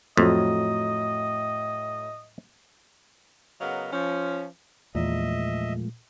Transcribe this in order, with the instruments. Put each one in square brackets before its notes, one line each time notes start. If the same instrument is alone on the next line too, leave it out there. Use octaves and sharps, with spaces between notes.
[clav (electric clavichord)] F2 [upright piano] A2 F#3 [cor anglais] D#5
[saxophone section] C#3 F#3 B3 A#4 D#5 F5
F3 C#4
[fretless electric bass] E2 [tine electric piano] A#2 [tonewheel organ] F3 G#3 A3 [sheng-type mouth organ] D#5 E5